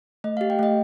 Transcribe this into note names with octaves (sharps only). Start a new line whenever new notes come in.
A3 D#5
F5
G4
G5
A3 D#5